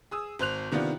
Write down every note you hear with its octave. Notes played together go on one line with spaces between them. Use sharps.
G#4 D#6 E6
G#1 C5 F#6 F7
C3 D#3 B3 D4 F4